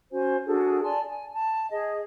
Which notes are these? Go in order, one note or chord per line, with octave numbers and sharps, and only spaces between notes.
C#4 F#4 C5 G#5
D4 F#4 G#4 A4
D5 G#5 A5 C6
G#5
A5
G#4 D#5